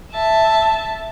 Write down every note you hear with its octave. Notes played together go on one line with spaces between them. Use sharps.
E5 A5